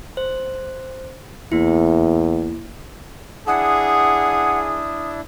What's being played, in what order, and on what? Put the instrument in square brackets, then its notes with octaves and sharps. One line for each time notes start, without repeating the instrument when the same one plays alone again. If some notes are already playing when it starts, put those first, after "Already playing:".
[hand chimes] C5
[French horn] E2 [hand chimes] A#3 E4
[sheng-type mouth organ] D4 E4 [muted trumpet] G#4 [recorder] F#5 [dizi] D#6